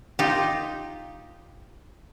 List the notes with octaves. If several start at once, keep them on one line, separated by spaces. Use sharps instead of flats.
D#4 F4 G4